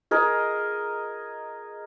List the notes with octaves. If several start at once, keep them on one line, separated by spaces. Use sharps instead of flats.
G#4 A#4 D#5